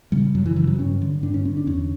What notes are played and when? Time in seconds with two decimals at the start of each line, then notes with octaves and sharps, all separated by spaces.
0.12 C#3 G3
0.35 F#2 F#3
0.46 E3
0.56 C#3 E3
0.67 F#3
0.78 G2 C#4
1.02 D3
1.23 G2 D4
1.34 C#4
1.45 D3 C#4
1.57 D4
1.67 E2 C#4